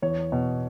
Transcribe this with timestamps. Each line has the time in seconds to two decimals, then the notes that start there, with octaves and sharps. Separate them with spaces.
0.02 E2 C#5
0.32 B2